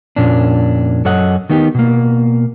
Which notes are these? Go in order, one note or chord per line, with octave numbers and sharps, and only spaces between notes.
F2 A#2 C#4 D4
F#2 A4 C#5 D#5 F#5
D#3 B3 D#4 G4
B2 A#3